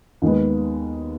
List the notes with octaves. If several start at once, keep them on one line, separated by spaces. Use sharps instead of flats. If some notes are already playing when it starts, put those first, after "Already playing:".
D#2 D#3 G#3 B3